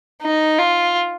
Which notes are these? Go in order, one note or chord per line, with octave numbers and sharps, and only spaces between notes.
D#4
F4